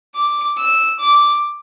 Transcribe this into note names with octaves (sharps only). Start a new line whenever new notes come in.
D6
E6
D6